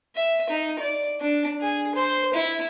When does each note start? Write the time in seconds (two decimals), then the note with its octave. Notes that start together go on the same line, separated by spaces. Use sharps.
0.16 E5
0.50 D#4
0.79 D5
1.21 D4
1.61 G#4
1.95 C5
2.34 E4